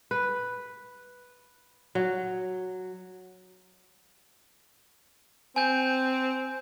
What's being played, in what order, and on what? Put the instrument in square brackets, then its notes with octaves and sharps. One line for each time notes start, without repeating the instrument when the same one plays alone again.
[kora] B4
F#3
[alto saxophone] C4 [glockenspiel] G#5 G6